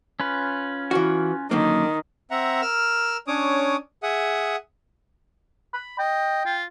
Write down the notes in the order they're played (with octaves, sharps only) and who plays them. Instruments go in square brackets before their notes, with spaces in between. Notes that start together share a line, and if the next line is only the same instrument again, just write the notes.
[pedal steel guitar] C#4 F4 B4
[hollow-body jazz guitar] E3 F#4
[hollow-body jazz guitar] F#2 D3 A#3 [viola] D#3
[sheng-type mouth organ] C4 E5 F#5 A#5
A#4 E6 F6
C#4 D4 C#5 D6 D#6
G#4 E5 F#5 D#6
[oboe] B5
[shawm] D#5 [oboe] G5
[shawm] F4